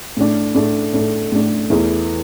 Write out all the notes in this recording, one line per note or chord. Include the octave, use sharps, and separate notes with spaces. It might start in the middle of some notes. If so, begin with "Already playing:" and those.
A2 A3 D4
A2 A3 D4
A2 A3 D4
A2 A3 D4
E2 E3 A3 E4